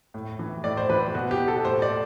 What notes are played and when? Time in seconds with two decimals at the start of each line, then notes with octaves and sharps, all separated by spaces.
0.14 A2
0.39 E3
0.64 A2 D5
0.77 C5
0.89 E3 B4
1.14 B2 F#4
1.31 G4
1.48 A4
1.65 A2 C5
1.82 D5